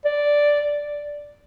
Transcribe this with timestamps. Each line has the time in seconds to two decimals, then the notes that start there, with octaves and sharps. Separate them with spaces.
0.05 D5